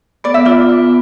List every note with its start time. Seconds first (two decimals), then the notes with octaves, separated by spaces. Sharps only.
0.24 B3 D5
0.34 E5
0.45 F4 D5
0.69 B3